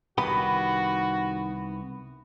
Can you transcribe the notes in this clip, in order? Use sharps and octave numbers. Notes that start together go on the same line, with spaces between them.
C2 D#3 B3 F#4 G4 B5